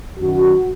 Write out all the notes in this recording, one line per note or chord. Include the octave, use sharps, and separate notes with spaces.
F#2 D#3 F#4